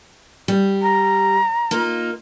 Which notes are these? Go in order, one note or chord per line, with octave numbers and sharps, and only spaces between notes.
G3
A#5
A#3 D#4 F4